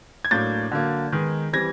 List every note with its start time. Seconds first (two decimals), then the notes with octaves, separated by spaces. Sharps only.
0.25 G#6
0.31 A2 F#3 A#3 D4 G6 A6
0.72 D3 F#3 A#3
1.12 D#3 G#3 B3
1.53 E3 G3 C4 G#6 A#6